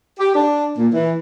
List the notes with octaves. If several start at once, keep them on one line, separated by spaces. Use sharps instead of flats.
G4
D4
A#2
E3